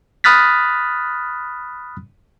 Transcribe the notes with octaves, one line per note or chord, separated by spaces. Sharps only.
B5 D#6 F6 F#6 A6 B6